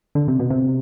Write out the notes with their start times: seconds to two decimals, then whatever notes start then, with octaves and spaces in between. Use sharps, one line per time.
0.15 D3
0.28 C3
0.39 B2
0.50 C3